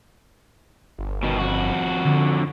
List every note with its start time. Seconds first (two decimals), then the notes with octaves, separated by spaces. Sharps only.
0.98 G1
1.23 B2 D#3
1.39 F2 F#4
2.05 D3